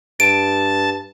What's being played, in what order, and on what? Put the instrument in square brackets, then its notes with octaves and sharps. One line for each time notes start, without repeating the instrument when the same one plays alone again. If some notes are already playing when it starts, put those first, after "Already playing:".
[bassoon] G2 [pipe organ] A5 [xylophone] D7